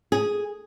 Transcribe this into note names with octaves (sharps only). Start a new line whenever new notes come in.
G#4